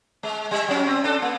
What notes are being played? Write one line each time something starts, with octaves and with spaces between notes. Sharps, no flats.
G#3
G3 E5
F#3 C#4
C4
D4 A4
A#3